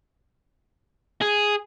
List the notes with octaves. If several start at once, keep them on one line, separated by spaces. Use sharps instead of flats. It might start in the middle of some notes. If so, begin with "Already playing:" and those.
G#4